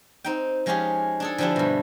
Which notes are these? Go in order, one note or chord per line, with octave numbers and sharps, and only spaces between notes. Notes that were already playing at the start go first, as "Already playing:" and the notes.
C4 D#4 G5
F3 G#3 C#4 F4 G4 G#4
D4 G#4 A4
D3 F3 D4 E4 G4
G2 B2